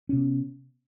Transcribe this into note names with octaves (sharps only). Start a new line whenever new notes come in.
C3 B3 C#4